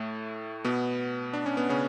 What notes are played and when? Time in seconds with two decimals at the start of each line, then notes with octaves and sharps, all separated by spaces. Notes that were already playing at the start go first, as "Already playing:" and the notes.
Already playing: A2 A3
0.65 B2 B3
1.33 D4
1.46 C#4
1.57 B3
1.69 C#3 C#4